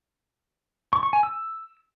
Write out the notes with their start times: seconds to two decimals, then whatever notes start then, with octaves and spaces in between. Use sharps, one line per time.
0.93 C#6
1.03 C#6
1.13 G#5
1.23 E6